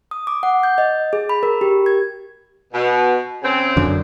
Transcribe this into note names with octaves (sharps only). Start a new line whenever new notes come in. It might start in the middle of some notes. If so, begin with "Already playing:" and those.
D#6
D6
F#5
G6
D#5
G#4
B5
A#4
G4
G#6
B2
C#3 C4
F#2 D3